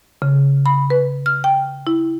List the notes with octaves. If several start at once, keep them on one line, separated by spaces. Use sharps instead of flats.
C#3
B5
B4
F6
G5
E4